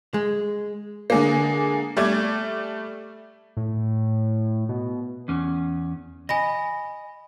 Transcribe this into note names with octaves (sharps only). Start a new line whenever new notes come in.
G#3
D3 G#3 A#3
G3 A3 D5 G#6
A2
B2
E2 C#4
D#5 G#5 B5 A#6